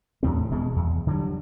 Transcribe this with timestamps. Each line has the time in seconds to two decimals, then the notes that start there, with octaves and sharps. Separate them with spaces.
0.23 E2 A2 C4
0.50 D#1 B2 G#3
0.76 E2
1.07 D3 F#3 G3